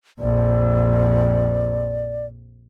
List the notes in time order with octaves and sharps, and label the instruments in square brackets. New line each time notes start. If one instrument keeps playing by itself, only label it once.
[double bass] A#1 F2 [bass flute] D5